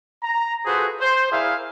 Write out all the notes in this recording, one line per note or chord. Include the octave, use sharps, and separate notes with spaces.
A#5
F4 F#4 G#4 A4 B4 C5
C5
E4 G#4 A#4 D5 E5 F5